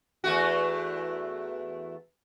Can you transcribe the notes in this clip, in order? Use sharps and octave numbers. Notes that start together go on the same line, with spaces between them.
E2 A3 F#4